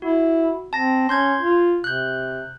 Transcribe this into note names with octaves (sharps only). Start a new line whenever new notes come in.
E4 F#4
C4 A5 A#6
C#4 C6 G6 G#6
F4
C3 F#6 G6